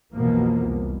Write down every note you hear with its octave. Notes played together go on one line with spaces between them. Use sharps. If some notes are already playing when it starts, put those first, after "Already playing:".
B1 F2 B2 E3 F3 A#3
C2